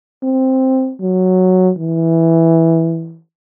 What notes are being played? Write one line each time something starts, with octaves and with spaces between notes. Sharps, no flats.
C4
F#3
E3